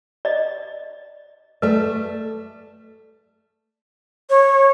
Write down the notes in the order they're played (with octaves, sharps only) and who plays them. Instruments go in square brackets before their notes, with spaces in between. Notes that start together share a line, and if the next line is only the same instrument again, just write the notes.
[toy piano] D5 D#5
[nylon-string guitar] A3 D5 [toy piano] B4
[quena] C#5